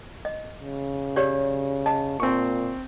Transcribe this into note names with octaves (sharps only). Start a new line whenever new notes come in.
D#5
C#3
G4 C#5 D5
D#5 A5
A#2 C4 C#6